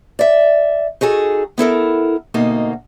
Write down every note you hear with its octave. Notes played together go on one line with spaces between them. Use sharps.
D5 E5
D#4 F#4 G#4 A4
B3 E4 A4 A#4
D2 B2 A#3 D#4 D#5